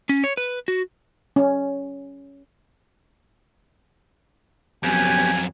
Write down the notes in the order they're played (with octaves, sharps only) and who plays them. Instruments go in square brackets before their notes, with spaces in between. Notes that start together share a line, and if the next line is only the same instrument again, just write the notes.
[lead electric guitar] C#4
C#5
B4
F#4
[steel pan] C#4
[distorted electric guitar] F2 F#3 [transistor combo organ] B3 C#4 G4 [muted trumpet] G#5